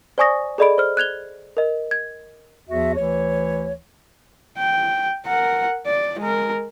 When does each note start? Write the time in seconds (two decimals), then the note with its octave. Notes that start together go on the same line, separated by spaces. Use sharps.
0.18 C5 D5 G#5 C#6 D#6 A#6
0.58 G#4 A4 D5 D#5 B5 D7
0.78 C5 F6
0.97 F#6 G#6 F7 G7
1.57 A#4 D#5
1.91 G#6
2.69 E2 F3 F#4 E5
2.97 D2 E3 C#5
4.58 G5
5.26 A#4 F#5
5.86 D5
6.20 G#3 A#4